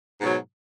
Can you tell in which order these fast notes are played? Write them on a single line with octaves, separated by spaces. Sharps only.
G#2 B2 F#3